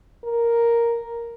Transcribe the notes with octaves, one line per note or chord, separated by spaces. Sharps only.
A#4